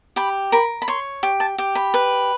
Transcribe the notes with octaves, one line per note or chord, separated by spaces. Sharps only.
G4 B5
A#4 B5
B5
C#5 C6
G4
A5
G4
B5
B4